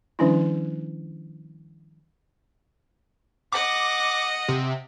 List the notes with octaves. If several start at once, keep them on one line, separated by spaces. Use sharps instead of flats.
D#3 F3 G3 C#4 D4 E4
D#5 F#5 D6
C3